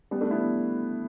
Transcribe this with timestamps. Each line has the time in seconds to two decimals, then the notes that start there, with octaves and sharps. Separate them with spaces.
0.11 G3 B3
0.21 A3 D4
0.31 B3 E4